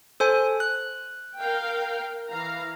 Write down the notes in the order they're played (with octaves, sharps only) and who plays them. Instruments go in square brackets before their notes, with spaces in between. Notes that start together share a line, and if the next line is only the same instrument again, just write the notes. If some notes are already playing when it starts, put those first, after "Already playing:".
[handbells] A4 C5 G#5
F#6
[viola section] A#4 F5 G5
E3 F5 A#5